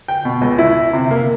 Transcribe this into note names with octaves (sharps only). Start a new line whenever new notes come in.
G5
B2
C#2
E4
C3
A#3